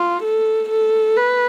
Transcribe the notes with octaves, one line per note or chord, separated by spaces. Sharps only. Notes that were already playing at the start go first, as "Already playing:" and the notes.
Already playing: F4
A4
A4
B4